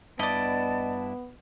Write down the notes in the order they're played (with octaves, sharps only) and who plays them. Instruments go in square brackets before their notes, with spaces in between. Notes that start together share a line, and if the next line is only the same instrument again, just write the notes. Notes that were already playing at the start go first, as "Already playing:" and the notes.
[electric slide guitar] G2 D4 E4 [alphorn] B3 [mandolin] D5 D#5 [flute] A5